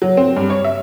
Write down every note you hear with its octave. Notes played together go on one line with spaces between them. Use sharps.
F#3
C4
G2
C#5
E5